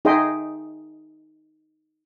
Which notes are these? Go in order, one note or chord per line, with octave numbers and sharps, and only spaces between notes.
D#4 G#4 D#5 E5 G5 C6